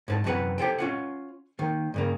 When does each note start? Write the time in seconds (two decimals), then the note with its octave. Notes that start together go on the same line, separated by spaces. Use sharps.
0.08 G#2 B4 A5
0.24 F#2 C3 E3 F#4 B4 F#5
0.58 G4 A4 C5 G5
0.78 C#4 F4 F#5
1.59 D#3 A#3
1.94 G2 C#3 A#3